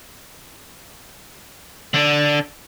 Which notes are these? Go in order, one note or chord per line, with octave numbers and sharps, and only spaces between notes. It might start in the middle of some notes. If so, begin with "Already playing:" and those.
D3 D4